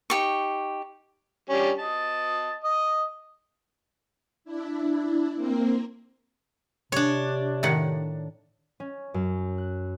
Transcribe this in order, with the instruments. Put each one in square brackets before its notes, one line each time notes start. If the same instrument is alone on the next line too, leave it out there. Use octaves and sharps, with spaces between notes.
[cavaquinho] D#4 G4 C#6
[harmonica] G3 C#4 D4
D#5 A5
D#5
[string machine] D4 E4
A#3 C4 A#4
[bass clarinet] C3 [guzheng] D4 C#5
[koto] A2 D#3 F#5
[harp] C#4
F#2
F#6